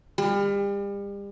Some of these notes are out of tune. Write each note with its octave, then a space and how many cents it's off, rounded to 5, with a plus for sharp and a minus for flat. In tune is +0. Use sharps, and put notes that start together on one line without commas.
G3 +35